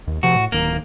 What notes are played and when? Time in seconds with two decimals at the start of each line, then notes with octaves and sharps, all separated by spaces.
0.07 D#2
0.23 C3 F3 F#4
0.35 A2
0.52 D1 D#3 A#3